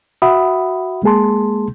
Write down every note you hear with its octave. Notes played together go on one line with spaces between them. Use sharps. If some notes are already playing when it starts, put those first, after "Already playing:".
F#4 E5 F#5 B5 D#6
G#3 A#3 G#4 A5 C6